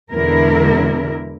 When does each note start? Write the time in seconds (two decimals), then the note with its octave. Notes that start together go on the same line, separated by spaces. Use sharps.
0.13 E2 B2 D3 G#3 E4 A#4